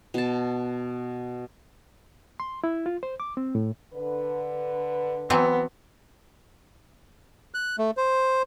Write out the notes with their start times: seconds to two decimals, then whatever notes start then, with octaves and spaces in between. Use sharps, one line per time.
0.14 B2 A5
2.40 C6
2.64 E4
2.86 F4
3.03 C5
3.20 D6
3.37 C4
3.55 A2
3.94 D3 B4
5.30 E3 F#3 B3 C4
7.54 F#6
7.78 A3
7.97 C5